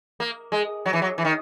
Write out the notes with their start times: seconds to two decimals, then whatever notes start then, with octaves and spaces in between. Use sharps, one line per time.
0.20 A#3
0.52 G#3
0.86 F#3
0.93 E3
1.02 F#3
1.18 E3
1.25 D#3